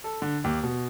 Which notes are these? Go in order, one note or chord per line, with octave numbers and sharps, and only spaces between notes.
A4
D3
D#2
B2